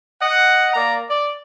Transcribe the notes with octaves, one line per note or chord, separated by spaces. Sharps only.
D#5 F#5
A#3 D5 A#5
D5